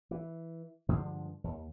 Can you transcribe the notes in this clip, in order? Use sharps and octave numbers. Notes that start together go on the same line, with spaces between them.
E3
G2 D3 F3 G#3
D#2